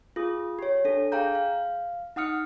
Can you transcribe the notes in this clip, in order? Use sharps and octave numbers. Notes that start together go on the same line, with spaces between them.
F4 G#4 D#6
G4 C#5
D4 A4
G#4 F5 G5 A#5 G6
F5
D#4 F#5 D#6 F6 C#7